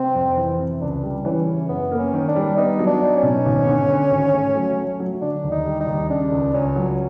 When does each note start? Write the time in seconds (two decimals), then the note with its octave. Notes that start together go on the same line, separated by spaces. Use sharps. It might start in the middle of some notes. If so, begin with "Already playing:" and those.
Already playing: C3 C4
0.15 F2
0.37 E3
0.59 C3
0.81 C#2 D4
1.03 G3
1.25 E3 C#4
1.47 C#3
1.69 F#2 B3
1.91 A#3
1.98 C#4
2.14 D#3
2.28 D4
2.36 G3
2.57 B3 D#4
2.79 F#3
2.86 D4
3.02 D#4
3.16 C#4
3.23 B2
3.46 G#1
3.67 D3
3.90 D3
4.11 G#1
4.34 A3
4.56 F#3
4.77 A3
5.00 F#3
5.21 D3 D4
5.44 D#2
5.51 D#4
5.66 G3
5.80 D#4
5.87 D#2
6.10 C#3 D4
6.32 C#2
6.54 C#2 C#4
6.76 F#3